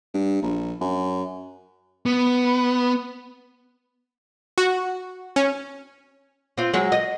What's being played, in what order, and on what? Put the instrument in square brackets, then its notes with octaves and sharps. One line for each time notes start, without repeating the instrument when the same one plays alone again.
[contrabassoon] G2
A#1
F#2
[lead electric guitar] B3
[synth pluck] F#4
C#4
[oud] C4 F4
F#3 G#3
D#5